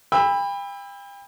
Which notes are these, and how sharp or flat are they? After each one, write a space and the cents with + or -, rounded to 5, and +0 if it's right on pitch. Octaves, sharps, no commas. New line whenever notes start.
G5 +40 B5 +0 E6 +0